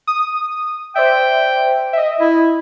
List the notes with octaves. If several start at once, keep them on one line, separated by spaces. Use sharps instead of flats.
D#6
C5 D5 E5 G5
D#5 E5
E4